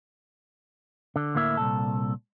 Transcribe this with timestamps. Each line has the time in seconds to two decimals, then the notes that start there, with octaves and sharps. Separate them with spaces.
1.16 D3
1.35 D2 A2 A#3 E4 E5
1.57 C2 F#2 A#2 A4